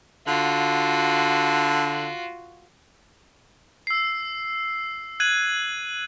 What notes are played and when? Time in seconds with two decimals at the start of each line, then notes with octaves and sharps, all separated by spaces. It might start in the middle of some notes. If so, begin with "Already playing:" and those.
0.27 D3 F4 F#4
3.87 E6 C7
5.20 F#6 G#6 D#7 F#7